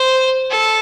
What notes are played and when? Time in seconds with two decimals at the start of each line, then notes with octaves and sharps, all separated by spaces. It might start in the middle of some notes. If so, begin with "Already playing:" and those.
Already playing: C5
0.50 A4